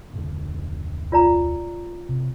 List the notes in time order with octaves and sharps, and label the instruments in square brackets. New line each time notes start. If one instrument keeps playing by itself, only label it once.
[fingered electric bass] D1 F2 D3
[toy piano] F4 D5 A#5
[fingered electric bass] C3